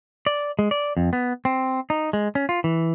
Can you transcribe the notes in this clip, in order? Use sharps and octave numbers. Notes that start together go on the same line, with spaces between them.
D5
G#3
D5
F2
B3
C4
D#4
G#3
C#4
F4
E3